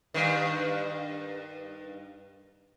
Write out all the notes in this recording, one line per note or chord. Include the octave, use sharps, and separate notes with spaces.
G2 D#3